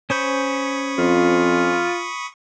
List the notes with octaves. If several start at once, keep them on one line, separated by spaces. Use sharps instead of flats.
C#4 C5 B5 C#6 D#6 G6
F2 F4